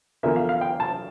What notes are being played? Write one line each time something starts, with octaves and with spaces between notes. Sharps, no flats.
E2 D3 F3 A#3 E5
F5
F5
G5
A5